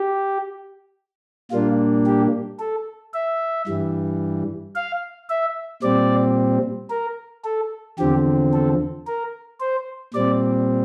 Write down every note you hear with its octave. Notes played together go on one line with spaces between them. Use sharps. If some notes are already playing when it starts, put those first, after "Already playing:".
Already playing: G4
A#2 G3 A#3 D4 F4
G4
A4
E5
G2 E3 G3
F5
E5
A#2 G3 C4 D5
A#4
A4
E2 D3 F3 C4 G4
A4
A#4
C5
A#2 G3 C4 D5